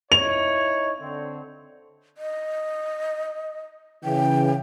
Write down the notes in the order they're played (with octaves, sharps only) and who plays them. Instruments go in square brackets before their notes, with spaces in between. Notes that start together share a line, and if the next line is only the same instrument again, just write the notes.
[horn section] D#4 E4 C#5 [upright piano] F7
[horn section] D3 C4
[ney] D#5
[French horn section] C#3 E3 [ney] G5